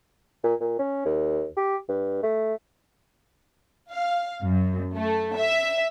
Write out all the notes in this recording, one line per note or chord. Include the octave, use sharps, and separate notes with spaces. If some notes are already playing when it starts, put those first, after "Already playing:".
A#2
A#2
C#4
D#2
G4
G2
A3
F5
F#2
A3
E5